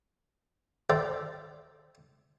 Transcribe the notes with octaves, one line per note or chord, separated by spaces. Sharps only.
A4 A#4 C5 D5 E5 G5